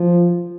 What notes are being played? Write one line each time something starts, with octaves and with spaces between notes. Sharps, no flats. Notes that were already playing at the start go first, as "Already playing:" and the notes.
Already playing: F3